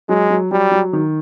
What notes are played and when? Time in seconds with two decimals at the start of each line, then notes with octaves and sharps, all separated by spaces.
0.09 F#3 G#3
0.30 F#3
0.51 F#3 G3
0.71 F#3
0.93 D#3